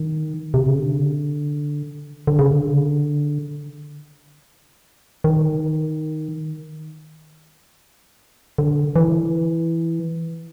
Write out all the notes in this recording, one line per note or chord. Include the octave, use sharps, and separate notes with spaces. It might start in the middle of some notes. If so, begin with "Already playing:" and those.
Already playing: D#3
C3
C#3
D3
D3
C#3
D3
D#3
D3
E3